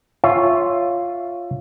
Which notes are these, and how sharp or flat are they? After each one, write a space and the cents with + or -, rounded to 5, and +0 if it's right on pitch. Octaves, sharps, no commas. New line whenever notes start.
F4 +0 C#5 +0 E5 +15